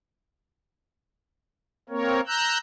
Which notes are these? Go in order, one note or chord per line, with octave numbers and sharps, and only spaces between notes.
A#3 C4 A#4 C#5
A#5 E6 F#6 G6